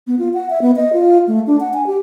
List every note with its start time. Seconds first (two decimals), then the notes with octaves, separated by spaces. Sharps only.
0.07 B3
0.19 F4
0.34 F#5
0.50 E5
0.62 B3
0.76 D#5
0.93 F4
1.27 A3
1.47 D4
1.60 F#5
1.74 G#5
1.87 G4